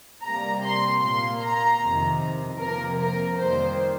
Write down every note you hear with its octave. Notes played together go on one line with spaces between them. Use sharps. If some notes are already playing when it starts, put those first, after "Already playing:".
C3 G3 A#3 A#5
C6
A#2 A#3 C6
A#5
F2 C3 D#3
C3 F3 A#3 A#4
A#4
F2 D#3 G3 A#3 C5